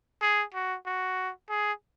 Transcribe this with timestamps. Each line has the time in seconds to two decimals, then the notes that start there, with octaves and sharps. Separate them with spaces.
0.21 G#4
0.54 F#4
0.86 F#4
1.50 G#4